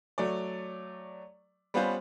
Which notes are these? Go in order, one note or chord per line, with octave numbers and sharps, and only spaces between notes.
F#3 A3 D5
G3 B3 C#4 F4 B4 C5